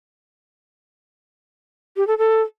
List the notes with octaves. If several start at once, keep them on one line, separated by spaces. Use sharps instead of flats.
G4
A4
A4